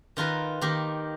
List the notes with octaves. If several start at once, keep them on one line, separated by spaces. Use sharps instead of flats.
D#3 F4 A#4 B4
D#3 A#3 G4